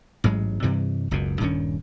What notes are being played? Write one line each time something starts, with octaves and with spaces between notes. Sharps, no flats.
A1 G#2 F#3 G#3
G2 C3 E3 G3
F#1 C#2 F#2 B2
D#1 G2 D#3 C#4